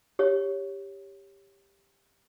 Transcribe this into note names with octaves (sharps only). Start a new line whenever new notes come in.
G4 C#5